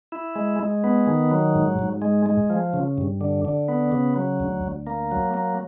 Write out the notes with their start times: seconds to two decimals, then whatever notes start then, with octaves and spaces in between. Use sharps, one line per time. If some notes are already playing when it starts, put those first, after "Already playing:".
0.12 E4
0.36 G#3
0.60 G#3
0.84 B3
1.07 D#3
1.31 F#3
1.55 G#2
1.79 G#2
2.02 G#3
2.26 G#3
2.50 F3
2.74 C#3
2.98 G2
3.21 D3
3.45 D3
3.69 B3
3.92 C#3
4.16 F#3
4.40 D2
4.64 D2
4.87 A#3
5.11 F#3
5.34 A#3